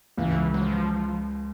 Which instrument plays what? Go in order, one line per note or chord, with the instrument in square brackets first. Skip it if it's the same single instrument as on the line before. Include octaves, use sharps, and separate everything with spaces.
[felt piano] C#2 [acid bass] E3
[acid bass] F#3
F3